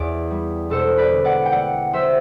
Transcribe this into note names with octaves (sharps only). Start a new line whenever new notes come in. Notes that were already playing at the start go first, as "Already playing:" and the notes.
Already playing: E2 D5
G3
E1 A4 C5
B4 D5
D3
D5 F#5
G5
A3 D5 F#5
F#3 C5 E5